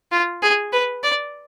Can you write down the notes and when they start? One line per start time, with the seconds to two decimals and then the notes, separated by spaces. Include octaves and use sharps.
0.12 F4
0.43 G#4
0.73 B4
1.03 D5